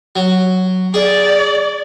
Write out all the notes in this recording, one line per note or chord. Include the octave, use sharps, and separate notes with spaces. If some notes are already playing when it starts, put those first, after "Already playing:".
F#3
G#4 D5